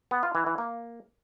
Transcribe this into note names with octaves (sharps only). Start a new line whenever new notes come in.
B3
F4
E3
E3
A#3